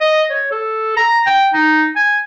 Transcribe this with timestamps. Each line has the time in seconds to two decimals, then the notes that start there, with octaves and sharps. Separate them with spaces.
0.01 D#5
0.30 C#5
0.52 A4
0.97 A#5
1.27 G5
1.54 D#4
1.96 G#5